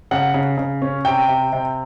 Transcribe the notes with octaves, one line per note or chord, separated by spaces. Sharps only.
C#3 F#5
C#3
C#3
C#4
C3 G5
C3
C3